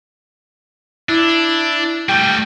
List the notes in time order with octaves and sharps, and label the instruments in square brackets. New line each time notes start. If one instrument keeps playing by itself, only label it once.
[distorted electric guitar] D4 [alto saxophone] E4
[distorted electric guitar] G3 A3 [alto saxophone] G5